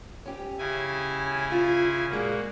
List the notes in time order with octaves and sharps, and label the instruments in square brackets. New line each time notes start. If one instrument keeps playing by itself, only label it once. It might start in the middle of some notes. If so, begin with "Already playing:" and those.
[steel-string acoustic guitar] C#4 G4
[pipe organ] C#3 E4 G#5
[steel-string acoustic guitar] F4
[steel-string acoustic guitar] A#2 G#3 [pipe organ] A#3 F#4